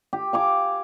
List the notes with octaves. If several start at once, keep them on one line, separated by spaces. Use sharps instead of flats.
G4
F5 G#5 D6